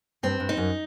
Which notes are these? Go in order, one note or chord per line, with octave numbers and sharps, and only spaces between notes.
G2 C4
G2
D#4
F#2